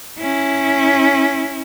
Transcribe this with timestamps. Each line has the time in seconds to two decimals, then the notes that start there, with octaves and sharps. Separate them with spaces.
0.19 C#4 E4